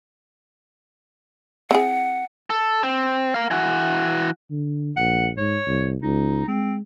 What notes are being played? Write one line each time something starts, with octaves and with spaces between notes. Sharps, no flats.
C4 E4 G#4 F#5
A4
C4
A#4 F5
E3 F#4
D3
A#1 F#5
G#2 C#5
C2
C#2 D#4
G#3 C4